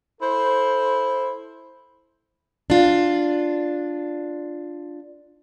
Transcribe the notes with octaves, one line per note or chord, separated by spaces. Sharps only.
E4 A4 C5
D4 F4